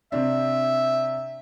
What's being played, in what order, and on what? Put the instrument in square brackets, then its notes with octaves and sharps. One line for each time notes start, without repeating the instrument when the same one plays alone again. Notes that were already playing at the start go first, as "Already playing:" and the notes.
[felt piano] C3 C4 D4 [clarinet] E5